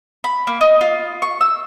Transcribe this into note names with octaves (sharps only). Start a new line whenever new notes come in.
B5
A#3
D#4
F4
C#6
E6